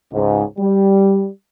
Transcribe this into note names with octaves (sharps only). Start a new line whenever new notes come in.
C#2 G#2
G3